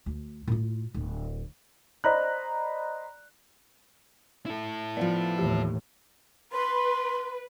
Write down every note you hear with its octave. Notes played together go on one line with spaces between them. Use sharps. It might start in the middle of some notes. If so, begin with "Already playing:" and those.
D2
A2 F4
D1
C5 D5 D#5 A#5 B5 F#6
E4 A4
F3 B3 D5 F5
D#2 A2 D#3 E3 G4
B4 C6